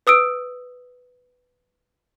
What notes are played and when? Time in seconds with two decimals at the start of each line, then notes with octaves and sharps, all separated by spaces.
0.07 B4 D#6 E6 D7